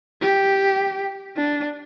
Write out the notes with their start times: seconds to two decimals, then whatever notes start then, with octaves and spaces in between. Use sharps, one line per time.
0.22 G4
1.37 D4